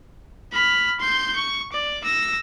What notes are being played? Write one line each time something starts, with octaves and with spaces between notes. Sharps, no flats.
B5 F6
C6 G6
C#6
D5
E6 A#6